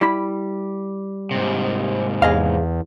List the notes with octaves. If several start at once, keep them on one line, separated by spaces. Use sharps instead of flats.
G3 E4 B5
G#2 C3
E2 G#4 D#5 F5